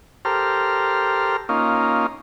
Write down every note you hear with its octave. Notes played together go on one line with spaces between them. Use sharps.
G4 A4 A#4 C5 F6
A#3 C#4 D#4 F4